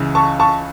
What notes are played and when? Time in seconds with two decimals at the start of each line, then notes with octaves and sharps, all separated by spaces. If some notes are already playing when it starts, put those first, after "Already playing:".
Already playing: C#2 C#3 E3
0.15 A5 C#6
0.40 A5 C#6